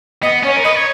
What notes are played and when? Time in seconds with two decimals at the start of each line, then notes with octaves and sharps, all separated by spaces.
0.22 B3 D#5
0.43 C#4 C#5
0.56 A#4
0.64 B4 D#5
0.75 C#5